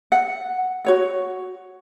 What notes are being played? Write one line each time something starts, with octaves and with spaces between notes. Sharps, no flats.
F#5
F#4 C#5 F#5